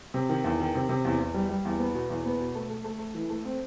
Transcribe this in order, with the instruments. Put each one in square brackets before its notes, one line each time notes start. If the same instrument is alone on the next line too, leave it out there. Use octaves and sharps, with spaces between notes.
[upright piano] C3
D#3
E2
D#3
C3
C3
E2
E2
G3
G3
E2
B3
B2
E2
B3
B2
A3
A3
A3
A3
E3
A3
C4